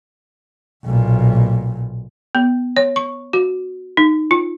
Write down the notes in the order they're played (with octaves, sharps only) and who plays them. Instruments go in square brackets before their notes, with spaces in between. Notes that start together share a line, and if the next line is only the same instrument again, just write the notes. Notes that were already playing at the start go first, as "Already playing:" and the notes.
[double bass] B1 A#2
[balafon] B3
C#5
C#6
F#4
D#4
F4